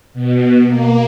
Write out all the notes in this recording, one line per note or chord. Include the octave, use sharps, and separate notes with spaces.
B2
A#3